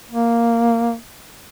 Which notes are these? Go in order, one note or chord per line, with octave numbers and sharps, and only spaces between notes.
A#3